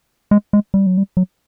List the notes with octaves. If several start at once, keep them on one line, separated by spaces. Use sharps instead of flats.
G#3
G#3
G3
F#3
G3
F#3